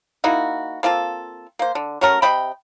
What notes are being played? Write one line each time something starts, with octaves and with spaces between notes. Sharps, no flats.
A#3 D#4 E4 F#4
A#3 C4 F4 A4
A#3 C5
D3
F#3 A3 C#4 A#4
C3 D#5 G5 B5